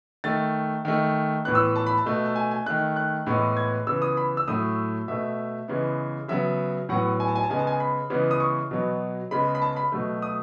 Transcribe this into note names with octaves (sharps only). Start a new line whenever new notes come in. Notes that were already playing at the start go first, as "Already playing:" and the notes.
D#3 A3 A6
D#3 A3
A2 E3 B3 F#6
E6
A5
B5
A5
B2 A3
A5
G#5
G#5
D#3 A3 F#6
F#6
A2 E3 G#3 B3
G#6
C#3 E3 B3 E6
D#6
B5
E6
A2 F#3 A3 D#6
B2 A3 E5
C#3 E3 G#3 B3
C#3 F#3 B3 E5
A2 F#3 B3 F#5
G#5
A5
G#5
A5
C#3 G#3 B3 G#5
A5
G#5
B5
C#3 E3 G#3 B3
D#6
C#6
B2 F#3 B3
C#3 G#3 B3 B5
B5
A5
B5
B2 F#3 A3
D#6